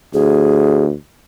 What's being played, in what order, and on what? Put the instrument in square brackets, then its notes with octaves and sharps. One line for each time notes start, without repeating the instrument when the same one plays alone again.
[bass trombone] D2 [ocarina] G#4